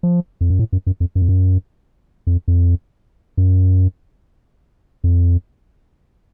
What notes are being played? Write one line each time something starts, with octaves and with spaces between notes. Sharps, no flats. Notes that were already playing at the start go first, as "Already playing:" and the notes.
F3
F2
F#2
A2
F#2
F#2
F2
F#2
F2
F#2
F2
F2
F#2
F2